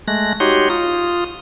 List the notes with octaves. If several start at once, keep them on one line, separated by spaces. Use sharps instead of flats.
G#3 A3 F#6 A#6
D#4 F#4 G4 C#5 C6
F4 D#6